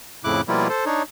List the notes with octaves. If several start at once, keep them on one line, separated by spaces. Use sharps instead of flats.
F2 A2 C#3 E4 D6 F#6
B2 F3 G3 A#3 E4 F4
A4 C5
D4 D#4 C#5